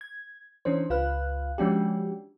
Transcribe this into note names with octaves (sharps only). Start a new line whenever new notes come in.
G#6
E3 C#4 D4 C5
C#2 F4 B4 F5 F#6
F3 G#3 C#4 D4 F#4 G4